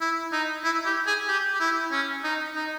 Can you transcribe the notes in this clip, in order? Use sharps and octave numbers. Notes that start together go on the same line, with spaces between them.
E4
D#4
E4
G4
G#4
G4
G4
E4
C#4
D#4
D#4